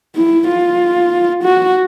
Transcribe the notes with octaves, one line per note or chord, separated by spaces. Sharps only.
E4
F4
F#4